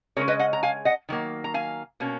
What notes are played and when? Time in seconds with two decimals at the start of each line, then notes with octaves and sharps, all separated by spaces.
0.17 C#3 G#3 C#4 A#4 C#5
0.28 B4 D#5
0.39 D#5 F#5
0.53 A#5
0.63 F5 G#5
0.85 D#5 F#5
1.09 D#3 F#3 A#3
1.44 A#5
1.54 F5 G#5
2.00 B2 A#3 C#4